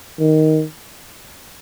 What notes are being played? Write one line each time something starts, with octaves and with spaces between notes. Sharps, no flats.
D#3